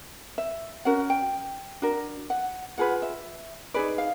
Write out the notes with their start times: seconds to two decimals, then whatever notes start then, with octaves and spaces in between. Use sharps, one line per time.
0.38 E5
0.85 C#4 F#4 A#4 F#5
1.10 G5
1.82 D4 F#4 A#4
2.30 F#5
2.78 F4 G#4 B4 F#5
3.02 E5
3.74 D#4 G#4 B4 D5
3.98 F5